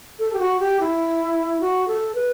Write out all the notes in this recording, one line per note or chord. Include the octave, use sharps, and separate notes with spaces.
A4
G4
F#4
G4
E4
F#4
A4
B4